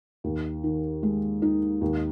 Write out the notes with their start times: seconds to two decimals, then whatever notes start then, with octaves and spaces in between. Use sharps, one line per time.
0.24 D#2
0.64 D#3
1.03 G#3
1.42 D#4
1.81 D#2